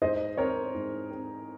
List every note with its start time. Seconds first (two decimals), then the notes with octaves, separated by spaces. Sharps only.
0.02 G#2 C5 D#5
0.37 C4 A#4 C#5
0.75 G#2
1.11 C4